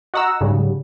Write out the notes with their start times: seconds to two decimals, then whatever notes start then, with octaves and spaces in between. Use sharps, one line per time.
0.14 F#4 D#5 F#5 A#5 E6
0.41 G#2 C#3 F#3 G3